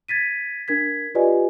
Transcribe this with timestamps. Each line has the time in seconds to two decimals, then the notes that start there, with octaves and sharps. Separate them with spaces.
0.08 G#6 A6 B6 D#7
0.68 D4 A#4 G#6 B6
1.15 F4 G4 B4 D5 D#5 G#5